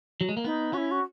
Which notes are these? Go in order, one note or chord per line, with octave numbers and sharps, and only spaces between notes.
F#3
G#3
A#3
B3 D#4
C#4 E4 F#4
F#4